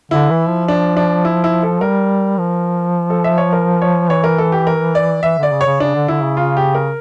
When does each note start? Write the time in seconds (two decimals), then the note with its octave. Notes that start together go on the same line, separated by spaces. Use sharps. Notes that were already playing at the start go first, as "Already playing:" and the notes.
0.11 D3 E4
0.30 E3
0.49 F3
0.68 D4
0.97 D4
1.25 E4
1.44 E4
1.63 A4
1.81 G3 A#4
2.38 F3
3.10 A4
3.24 E5
3.38 C#5
3.53 A#4
3.82 C#5
4.10 E3 C#5
4.24 A#4
4.38 A4
4.52 G4
4.67 A#4
4.95 D5
5.23 E3 E5
5.38 D3 D5
5.52 C#3
5.61 C#5
5.66 C#3
5.80 C#3 D4
5.95 D3
6.08 D3 E4
6.22 C#3
6.37 F4
6.57 G4
6.75 A#4